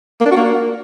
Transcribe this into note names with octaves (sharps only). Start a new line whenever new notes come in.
A#3
D4
F#4
A#3